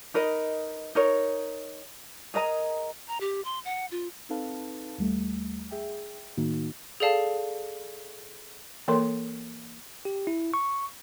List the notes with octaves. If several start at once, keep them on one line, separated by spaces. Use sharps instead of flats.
D#4 A#4 B4 D#5
D#4 A#4 C#5
G#4 A#4 D#5 A#5
A#5
G4
C6
F#5
F4
C4 D#4 A4 B4 F5 A5
D#2 G3 A3
G#4 E5 G5
A2 D#3 A#3 D#4 F#4
G#4 A4 D5 F5 A5
E3 A#3 A4 A#4 C#5 C6
G4
E4
C#6